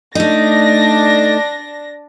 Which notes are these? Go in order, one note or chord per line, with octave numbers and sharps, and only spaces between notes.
A3 D4 D#4 A#6